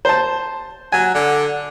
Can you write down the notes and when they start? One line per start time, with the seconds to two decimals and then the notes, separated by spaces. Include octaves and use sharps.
0.05 C5 A5
0.92 F#3 G#5
1.14 D3